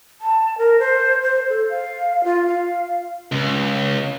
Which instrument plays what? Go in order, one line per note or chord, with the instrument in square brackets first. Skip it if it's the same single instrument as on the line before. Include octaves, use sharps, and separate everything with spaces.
[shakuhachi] A5
A#4
C5
C5
A4
F5
F4
F5
[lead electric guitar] C#2